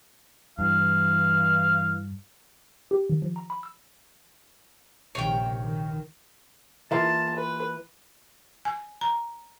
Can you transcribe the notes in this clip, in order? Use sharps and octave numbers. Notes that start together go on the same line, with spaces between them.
G2 E3 F5
G4
D#3
F3
A#5
B5
E6
A#1 C3 D#3 C#5 G5
D#3
E3 A#3 F4 A5
B4
G#5
A#5